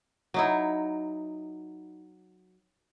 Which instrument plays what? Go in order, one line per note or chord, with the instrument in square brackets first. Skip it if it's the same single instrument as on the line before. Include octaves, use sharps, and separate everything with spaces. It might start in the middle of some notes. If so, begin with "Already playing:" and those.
[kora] F#3 D#4 E4